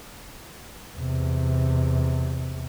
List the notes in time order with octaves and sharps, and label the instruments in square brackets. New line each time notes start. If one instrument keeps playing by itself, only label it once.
[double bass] E2 C3